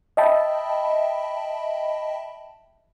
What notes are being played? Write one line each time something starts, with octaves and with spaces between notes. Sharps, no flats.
D#5 E5 G5 A5 B5